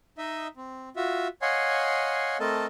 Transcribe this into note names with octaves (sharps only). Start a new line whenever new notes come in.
D#4 D#5 E5
C4
F4 F#4 E5
C#5 D#5 F5 F#5 G#5 C6
A3 C4 A4 A#4 D#5 A5